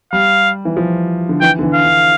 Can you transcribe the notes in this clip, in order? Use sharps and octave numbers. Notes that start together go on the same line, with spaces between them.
G3 F5
E3
F3
D3
E3 G5
D3
E3
F5
D3